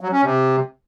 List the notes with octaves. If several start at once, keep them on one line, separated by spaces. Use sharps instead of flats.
F#3
C#4
C3